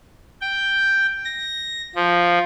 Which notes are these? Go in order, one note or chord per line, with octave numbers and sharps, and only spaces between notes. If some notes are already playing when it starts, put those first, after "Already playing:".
G5
A#6
F3